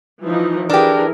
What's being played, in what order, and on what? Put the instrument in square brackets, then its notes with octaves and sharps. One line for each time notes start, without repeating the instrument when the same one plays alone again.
[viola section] E3 F3 D#4
[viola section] E3 G#4 A#4 [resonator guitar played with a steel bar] D4 G4